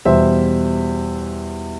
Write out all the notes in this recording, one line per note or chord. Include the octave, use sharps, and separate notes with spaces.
E2 B2 G3 C5 E5